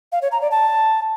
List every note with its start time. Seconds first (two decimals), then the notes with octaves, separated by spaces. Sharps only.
0.12 F5
0.22 C#5
0.32 A#5
0.41 D5
0.51 A5